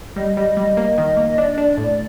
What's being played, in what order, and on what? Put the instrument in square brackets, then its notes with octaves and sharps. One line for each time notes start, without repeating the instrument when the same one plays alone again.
[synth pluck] G3 [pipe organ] D#5
[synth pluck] G3
G3
A#3
D#3
A#3
[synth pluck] D4 [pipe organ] D5
[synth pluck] D4
A2